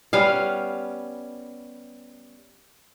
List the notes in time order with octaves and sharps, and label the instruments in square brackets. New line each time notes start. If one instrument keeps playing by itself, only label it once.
[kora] G3 B3 C#4 F5